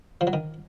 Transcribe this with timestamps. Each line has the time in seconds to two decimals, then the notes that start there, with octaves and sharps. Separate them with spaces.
0.21 F3
0.27 F#3
0.33 D#3